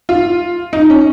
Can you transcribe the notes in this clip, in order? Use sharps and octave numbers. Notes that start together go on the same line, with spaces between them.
F4
D#4
C#4